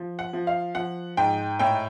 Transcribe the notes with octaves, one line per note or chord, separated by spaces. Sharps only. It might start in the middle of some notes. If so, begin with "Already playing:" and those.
Already playing: F3
F#5
F3
F5
F3 F#5
G#2 G5
A2 G5